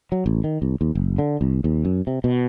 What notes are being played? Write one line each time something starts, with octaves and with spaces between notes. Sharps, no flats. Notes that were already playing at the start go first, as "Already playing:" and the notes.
F#3
A1
D#3
C2
D#2
F#1
D3
C2
D#2
F#2
C3
B2